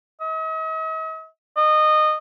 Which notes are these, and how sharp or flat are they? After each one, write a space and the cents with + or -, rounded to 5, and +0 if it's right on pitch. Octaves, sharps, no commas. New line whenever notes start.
D#5 +45
D#5 -20